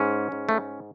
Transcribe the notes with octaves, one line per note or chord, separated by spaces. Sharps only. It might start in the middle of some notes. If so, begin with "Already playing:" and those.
Already playing: G#2 C#4
G#2
A3